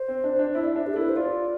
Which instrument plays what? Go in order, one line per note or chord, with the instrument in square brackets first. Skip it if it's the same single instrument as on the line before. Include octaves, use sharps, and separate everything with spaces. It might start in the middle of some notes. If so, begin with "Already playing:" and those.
Already playing: [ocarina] C5
[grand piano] C4
D4
D4
[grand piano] E4 [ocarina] E5
[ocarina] D5
[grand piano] D4 [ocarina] E5
[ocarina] G4
[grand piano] E4 [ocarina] A4
[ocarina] B4
C5
[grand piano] F4 [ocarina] D5